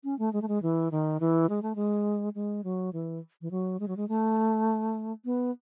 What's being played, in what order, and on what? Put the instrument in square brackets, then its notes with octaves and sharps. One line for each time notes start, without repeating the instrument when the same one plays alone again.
[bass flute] C#4
A3
G#3
A3
G#3
E3
D#3
E3
G#3
A3
G#3
G#3
F#3
E3
E3
F#3
G#3
F#3
G#3
A3
B3